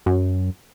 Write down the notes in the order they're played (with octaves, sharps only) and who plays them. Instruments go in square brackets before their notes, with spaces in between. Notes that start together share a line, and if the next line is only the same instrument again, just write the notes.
[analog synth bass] F#2